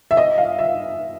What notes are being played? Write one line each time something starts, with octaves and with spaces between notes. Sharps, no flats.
E5
D#5
F5
E5